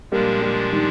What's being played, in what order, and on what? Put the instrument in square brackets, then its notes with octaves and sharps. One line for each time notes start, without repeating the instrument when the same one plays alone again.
[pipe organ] A#2 F3 G#3 D4 [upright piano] G3 A#3
[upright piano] G3 A#3
D#3 G3